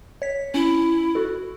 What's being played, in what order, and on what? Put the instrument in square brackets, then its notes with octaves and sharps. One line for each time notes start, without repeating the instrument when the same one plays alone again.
[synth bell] C#5 B6
[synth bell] C#4 [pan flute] E4
[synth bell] F#4 A4